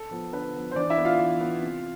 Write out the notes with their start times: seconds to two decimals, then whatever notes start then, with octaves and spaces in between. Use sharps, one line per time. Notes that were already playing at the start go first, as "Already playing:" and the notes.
Already playing: A4
0.11 F3 B3
0.33 D3 B4
0.55 F3 B3
0.71 C5
0.76 E3 D4 D5
0.90 E4 E5
0.98 B3
1.05 F4 F5
1.19 E3
1.41 B3
1.62 C3